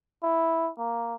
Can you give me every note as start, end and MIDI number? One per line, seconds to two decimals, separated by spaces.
0.23 0.71 64
0.78 1.15 58